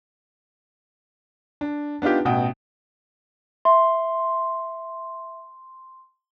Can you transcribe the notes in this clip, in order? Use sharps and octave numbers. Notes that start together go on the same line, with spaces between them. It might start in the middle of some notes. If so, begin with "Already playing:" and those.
D4
B3 D4 D#4 F4 G4
A1 B2 F#4 G5 D#6
E5 C6